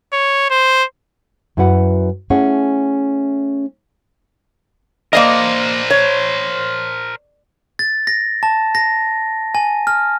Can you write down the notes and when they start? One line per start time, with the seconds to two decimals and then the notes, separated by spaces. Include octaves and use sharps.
0.13 C#5
0.51 C5
1.57 F#2 E4 F#4 B4 F#5
2.30 A3 C#4 E4 G#4 F#5
5.13 A#3 A#4 C5 D5 D#5
5.90 C#5
7.79 A6
8.07 A#6
8.43 A5
8.75 A#6
9.55 G#5
9.87 F6